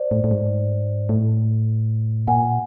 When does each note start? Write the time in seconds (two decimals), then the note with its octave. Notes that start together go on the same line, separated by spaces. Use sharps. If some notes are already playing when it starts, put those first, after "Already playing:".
Already playing: C5 D5
0.11 A2
0.24 A2
0.31 G#2
1.09 A2
2.27 A#2 F#5 G#5